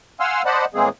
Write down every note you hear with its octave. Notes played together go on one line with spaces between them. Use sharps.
F5 F#5 G#5 C6 E6 F6
C5 D5 D#5 F#5 A5 B5
A2 E3 G#3 A#3 C4 G#4